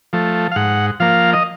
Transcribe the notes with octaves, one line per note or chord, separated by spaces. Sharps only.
F3 A3
F5
G#2 F#5
F3 A#3 F5
D#5